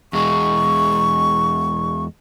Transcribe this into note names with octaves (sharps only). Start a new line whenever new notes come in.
E2 G#3 C#6